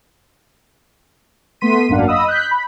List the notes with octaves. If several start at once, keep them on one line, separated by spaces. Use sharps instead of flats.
A3 B3 C6 B6 D#7
G#1 F#2 A#3 D4 F5 F#5
D#5 B5 D#6 E6
F#6 G6 B6
B5